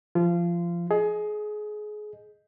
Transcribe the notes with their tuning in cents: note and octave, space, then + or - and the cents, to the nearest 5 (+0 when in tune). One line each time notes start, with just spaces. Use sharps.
F3 -20 F4 -25
G#4 +25 D#5 +0